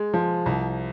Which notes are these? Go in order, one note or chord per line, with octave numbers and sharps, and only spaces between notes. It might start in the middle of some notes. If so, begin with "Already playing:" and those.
Already playing: G#3
F3
C2